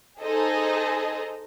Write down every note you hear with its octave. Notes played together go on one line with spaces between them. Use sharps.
D#4 G#4 A4 C5 D#5